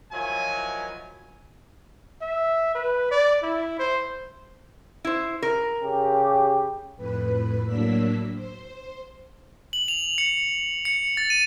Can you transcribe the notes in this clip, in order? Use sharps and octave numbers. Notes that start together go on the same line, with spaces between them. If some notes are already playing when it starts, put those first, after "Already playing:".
D#3 F3 F#3 E4 G#5
E5
B4
D5
E4
C5
E4 C5
A#4
C#3 G4
F2 A2 B4
A2 F#3 A#3 D4 E6 B6
C5
F#7
F7
C#7
C#7
A6
D#7